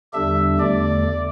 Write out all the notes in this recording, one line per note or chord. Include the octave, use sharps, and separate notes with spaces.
E2 D3 G3 D4 G4 E5
E2 D3 A3 D5